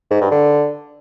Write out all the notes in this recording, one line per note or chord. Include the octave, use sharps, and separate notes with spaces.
G#2
G2
D3